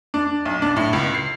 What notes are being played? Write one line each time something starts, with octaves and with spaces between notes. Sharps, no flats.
D4
B1
D4
A2
C#2
C7